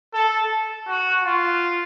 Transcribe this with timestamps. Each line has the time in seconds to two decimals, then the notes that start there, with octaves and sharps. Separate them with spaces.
0.14 A4
0.88 F#4
1.24 F4